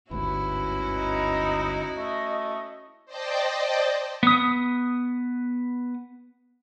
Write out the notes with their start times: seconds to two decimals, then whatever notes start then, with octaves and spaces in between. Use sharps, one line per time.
0.11 G1 D2 G#2 C#4 E4 F#4 B4
0.99 D#4
1.97 A3 D#5
3.06 C5 D5 D#5 G5 A5
4.23 B3 D#6